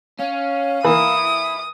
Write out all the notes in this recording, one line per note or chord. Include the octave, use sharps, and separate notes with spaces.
C#4 F5
E3 A#3 E5 B5 D#6